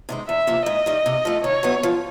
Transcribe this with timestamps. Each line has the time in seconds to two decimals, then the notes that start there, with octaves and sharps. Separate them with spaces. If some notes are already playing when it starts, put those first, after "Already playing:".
0.09 C3 D#3 G#3
0.28 E2 E5
0.47 C3 F3 A#3
0.66 G#2 D#5
0.86 D#3 G3
1.06 C3
1.25 F3 A3
1.44 D#3 C#5
1.63 F#3 B3 E4
1.83 F3